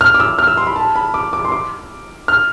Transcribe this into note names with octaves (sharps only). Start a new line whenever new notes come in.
F6
D6
E6
F6
E6
C6
B5
A5
B5
D6
D6
C6
D6
F6